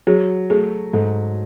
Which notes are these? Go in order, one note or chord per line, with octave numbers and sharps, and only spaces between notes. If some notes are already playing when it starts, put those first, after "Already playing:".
F#3 G#4
A3 G#4
G#2 A4